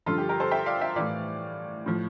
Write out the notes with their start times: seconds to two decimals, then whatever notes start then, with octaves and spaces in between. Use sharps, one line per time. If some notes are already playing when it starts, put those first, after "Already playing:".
0.06 G2 D3 F3 F4 A4
0.18 G4
0.29 G4 A#4
0.40 A4 C5
0.51 E5 G5
0.66 D5 F5
0.81 E5 G5
0.96 A2 E3 D5 F5
1.86 A2 F3